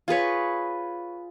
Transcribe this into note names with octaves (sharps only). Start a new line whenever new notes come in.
F4 G#4 B4 C#5